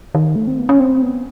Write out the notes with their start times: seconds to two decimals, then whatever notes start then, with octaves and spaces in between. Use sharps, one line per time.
0.15 D#3
0.36 A3
0.47 C4
0.58 B3
0.69 C#4
0.80 C4
1.02 B3